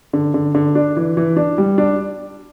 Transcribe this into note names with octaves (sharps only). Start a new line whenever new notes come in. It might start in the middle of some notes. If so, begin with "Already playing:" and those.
D3
D3
D3
D4
E3
E3
D4
G3
D4